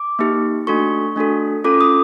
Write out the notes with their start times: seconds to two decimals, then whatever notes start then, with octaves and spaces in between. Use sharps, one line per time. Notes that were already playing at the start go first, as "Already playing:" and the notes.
Already playing: D6
0.19 A#3 D#4 G4
0.67 A3 D4 F#4 A4 C#6
1.16 A3 D4 F#4 A4
1.64 C#4 F4 A4 D6
1.81 D#6